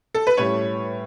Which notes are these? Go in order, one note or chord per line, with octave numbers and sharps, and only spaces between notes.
A4
B4
A2 G3 C#4 C#5